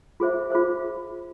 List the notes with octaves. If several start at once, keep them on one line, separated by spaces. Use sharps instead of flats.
F4 G#4 C5 E5
F4 G#4 C5 E5